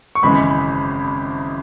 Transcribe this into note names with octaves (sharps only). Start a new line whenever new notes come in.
C#6
G#1 F#2 C#3 E3 G#3 B5